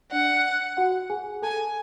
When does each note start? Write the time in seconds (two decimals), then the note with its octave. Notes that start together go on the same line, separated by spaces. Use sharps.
0.11 D4 D5 F#5
0.77 F#4 F#5
1.10 G#4 G#5
1.42 A4 G#5 A5